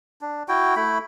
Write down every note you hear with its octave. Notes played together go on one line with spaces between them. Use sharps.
D4
E4 F#4 G5
A3 E4 B5